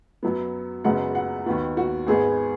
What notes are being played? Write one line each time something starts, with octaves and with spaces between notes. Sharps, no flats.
F#2 F#3 B3
F#1 F#2 C#3 G#3 B3 F#5
F#5
D#2 D#3 B3 F#4
F#4
G#1 G#2 G#3 B3 G#4